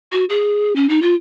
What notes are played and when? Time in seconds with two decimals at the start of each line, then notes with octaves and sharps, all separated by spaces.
0.12 F#4
0.29 G#4
0.76 C#4
0.89 D#4
1.02 F4